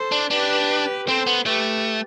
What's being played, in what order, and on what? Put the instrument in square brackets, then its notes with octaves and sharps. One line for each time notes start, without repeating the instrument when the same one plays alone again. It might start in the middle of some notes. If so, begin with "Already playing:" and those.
Already playing: [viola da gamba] A4 C5
[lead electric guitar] D4
[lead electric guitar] D4 [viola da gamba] G4 B4
[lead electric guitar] C4 [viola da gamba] A4 C5
[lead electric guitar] B3
[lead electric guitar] A3 [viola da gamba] G4 B4